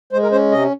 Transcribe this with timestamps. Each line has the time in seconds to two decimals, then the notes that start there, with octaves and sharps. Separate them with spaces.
0.13 G#3 C5
0.23 A#4
0.32 C#4 C5
0.52 C3 D#5